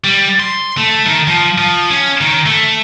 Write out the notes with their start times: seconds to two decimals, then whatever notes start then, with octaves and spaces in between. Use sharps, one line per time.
0.04 G3
0.40 C6
0.78 A3
1.06 D#3
1.27 F3
1.58 F3
1.91 C#4
2.21 D#3
2.46 A3